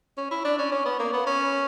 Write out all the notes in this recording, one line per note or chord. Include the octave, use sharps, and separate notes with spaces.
C#4
E4
D4
C#4
C#4
B3
A#3
B3
C#4